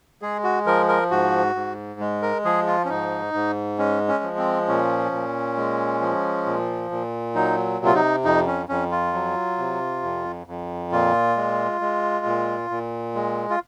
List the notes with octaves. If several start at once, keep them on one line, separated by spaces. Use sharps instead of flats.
G#3 G#4
F#4
F3 A#4
A#4
G#2 F#4
G#2
G#3
A#4
F3 G#4
F4
C#4
G#2 D#4
G#2
G#3 C#4
C#4
F3
C4
A#2 C#4
A#2
G#3
F3
A#2
A#2
F#3 D#4
C3
F4
D#4
F2 D#4
C#4
F2 C#4
F4
F#3
C3
F2
F2
A#2 F4
G#3
G#3
A#2
A#2
G#3
F4